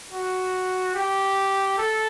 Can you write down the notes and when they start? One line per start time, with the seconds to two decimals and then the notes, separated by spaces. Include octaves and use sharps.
0.11 F#4
0.95 G4
1.78 A4